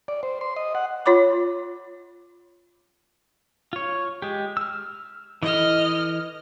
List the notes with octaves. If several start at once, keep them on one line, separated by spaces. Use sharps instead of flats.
D5
C5
C6
D#5
F#5
F4 C#5 B5 D6
F4 C#5
G#3 G4
E6 F6
E3 E4 A4 D#5 F6